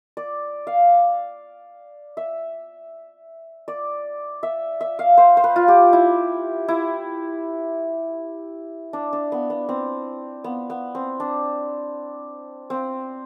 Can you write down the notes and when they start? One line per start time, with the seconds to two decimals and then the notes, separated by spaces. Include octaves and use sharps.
0.17 D5
0.67 F5
2.17 E5
3.68 D5
4.43 E5
4.81 E5
4.99 F5
5.18 C5
5.37 C5
5.44 B4
5.56 F4
5.68 G4
5.93 E4
6.68 E4
8.93 D4
9.13 D4
9.32 B3
9.50 B3
9.69 C4
10.44 B3
10.70 B3
10.95 C4
11.20 D4
12.70 C4